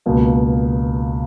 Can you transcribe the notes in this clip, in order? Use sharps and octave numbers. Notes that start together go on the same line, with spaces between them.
C#2 B2 A#3 F4